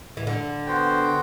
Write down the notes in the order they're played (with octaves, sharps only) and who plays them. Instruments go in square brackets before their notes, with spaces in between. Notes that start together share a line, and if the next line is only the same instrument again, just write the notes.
[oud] E3
D3
[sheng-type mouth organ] B3 F#4 C5 G5